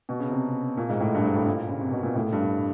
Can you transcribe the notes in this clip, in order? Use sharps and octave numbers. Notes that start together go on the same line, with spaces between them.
B2
C#3
C3
A#2
G#2
A2
G2
G#2
A2
A#2
C#3
C3
B2
A#2
A2
G2